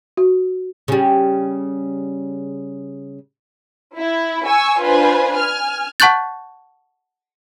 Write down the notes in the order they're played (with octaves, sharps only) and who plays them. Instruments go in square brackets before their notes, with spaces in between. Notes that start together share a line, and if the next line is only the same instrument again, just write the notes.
[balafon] F#4
[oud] C#3 G3
[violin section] E4
G#5 C#6 E6
D4 F4 B4 C5 G#5
G#5 F6
[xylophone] F#5 A5 C#6 F#6 G6 A6